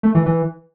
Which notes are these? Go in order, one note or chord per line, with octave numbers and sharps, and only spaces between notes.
A3
E3
E3